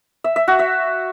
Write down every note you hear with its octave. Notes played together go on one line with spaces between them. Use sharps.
E5
E5
F#4
E5